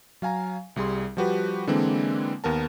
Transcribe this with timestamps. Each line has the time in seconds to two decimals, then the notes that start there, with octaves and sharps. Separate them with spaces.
0.22 F#3 F5 G#5 A#5
0.76 C2 G3 G#4 C6
1.17 F3 G3 F#4 G4 B4
1.67 D3 E3 G#3 A#3 C4 D4
2.44 D#2 B3 A#4 A5